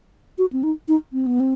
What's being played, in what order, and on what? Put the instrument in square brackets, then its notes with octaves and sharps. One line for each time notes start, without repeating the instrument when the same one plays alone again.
[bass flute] F#4
C4
D#4
D#4
C4
B3
C4